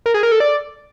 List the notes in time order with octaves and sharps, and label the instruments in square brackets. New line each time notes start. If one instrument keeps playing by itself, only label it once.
[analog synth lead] A#4
G#4
A#4
A4
D5